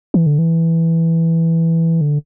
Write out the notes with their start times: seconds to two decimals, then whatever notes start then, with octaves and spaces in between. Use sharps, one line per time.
0.14 E3
0.26 D3
0.39 E3
2.01 D3